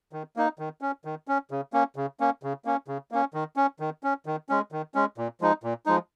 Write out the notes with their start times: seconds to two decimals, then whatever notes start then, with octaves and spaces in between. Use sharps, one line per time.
0.13 D#3
0.36 A#3 D#4
0.59 D#3
0.81 C#4
1.05 D#3
1.28 C#4
1.51 C#3
1.73 A#3 C#4
1.96 C#3
2.20 A#3 C#4
2.43 C#3
2.65 A#3 C#4
2.88 C#3
3.11 A#3 C#4
3.34 D#3
3.56 C#4
3.80 D#3
4.04 C#4
4.26 D#3
4.49 G#3 C#4
4.72 D#3
4.95 G#3 C#4
5.18 A#2
5.41 F3 G#3 D#4
5.64 A#2
5.86 F3 G#3 D#4